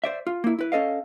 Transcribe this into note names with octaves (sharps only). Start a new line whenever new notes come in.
C5 D5 E5
F4
A#3 E4
E4 B4
C#4 A4 D#5 F5